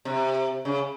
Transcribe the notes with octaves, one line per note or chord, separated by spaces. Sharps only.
C3
C#3